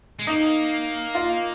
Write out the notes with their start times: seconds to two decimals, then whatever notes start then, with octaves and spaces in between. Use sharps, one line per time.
0.19 G#3
0.27 A#3 D#4
1.15 F4